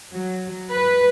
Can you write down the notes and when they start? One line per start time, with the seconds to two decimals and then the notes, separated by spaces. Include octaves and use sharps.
0.13 F#3
0.70 B4